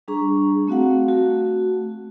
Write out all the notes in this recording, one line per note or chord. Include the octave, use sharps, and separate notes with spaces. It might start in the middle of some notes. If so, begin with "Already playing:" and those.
G3 D4 G#4 A#5 C#6
A3 C4 F#4 F5 F#5
A3 F#4